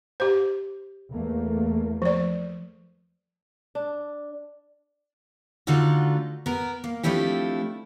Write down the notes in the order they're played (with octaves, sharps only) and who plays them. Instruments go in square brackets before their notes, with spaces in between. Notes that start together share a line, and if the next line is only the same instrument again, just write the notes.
[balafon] G4 C5
[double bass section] E2 A3 A#3
[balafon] F3 D5
[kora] D4
[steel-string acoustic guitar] D3 A3 D4 D#4 F4 F#4
B3 A#4
A#3
F3 A3 C4 D4 E4 G4